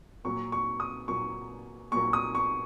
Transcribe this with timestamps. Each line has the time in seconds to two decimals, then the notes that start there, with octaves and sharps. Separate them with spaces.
0.24 A#2 F#3 A#3 C#6
0.52 C#6
0.80 D#6
1.08 A#2 F#3 A#3 C#6
1.92 A#2 F#3 A#3 C#6
2.13 D#6
2.35 C#6